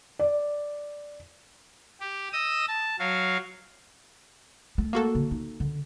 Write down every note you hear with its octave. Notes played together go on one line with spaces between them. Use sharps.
D5
G4
D#5 D#6 E6
A5
F#3 F#4 F5
A3
A#3 F#4 A4
D3
D#4
D3